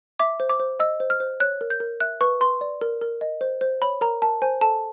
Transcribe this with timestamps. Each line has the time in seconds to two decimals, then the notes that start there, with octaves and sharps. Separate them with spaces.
0.20 E5 D6
0.40 C5
0.49 D6
0.60 C5
0.80 D#5 E6
1.00 C5
1.10 F6
1.20 C5
1.40 C#5 F#6
1.61 A#4
1.70 G6
1.80 A#4
2.00 E5 F#6
2.21 B4 C#6
2.41 B4 C6
2.61 D5
2.81 A#4
3.01 A#4
3.21 D#5
3.41 C5
3.61 C5
3.82 C#5 B5
4.01 A#4 A#5
4.22 A#4 A5
4.42 C5 G#5
4.61 A4 A5